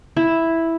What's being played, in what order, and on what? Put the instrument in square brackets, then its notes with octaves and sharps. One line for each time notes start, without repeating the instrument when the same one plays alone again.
[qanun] E4